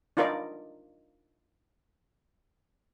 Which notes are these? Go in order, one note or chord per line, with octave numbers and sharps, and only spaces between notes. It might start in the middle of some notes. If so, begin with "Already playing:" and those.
D4 D#4 F4 A#4 B4 D5